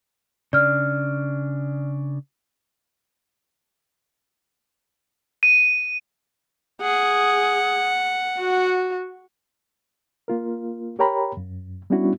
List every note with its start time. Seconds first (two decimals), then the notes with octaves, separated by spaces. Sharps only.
0.53 C#3 D4 D5 F6
5.43 D#7
6.82 G#4 F#5
8.39 F#4
10.28 A#3 F4 A#4
10.99 G4 A#4 C#5 G5 A#5 B5
11.37 F#2
11.90 G3 B3 C#4 D4 E4 F#4